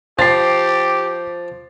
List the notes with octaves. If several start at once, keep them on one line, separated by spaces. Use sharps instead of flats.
F3 G4 A6 C7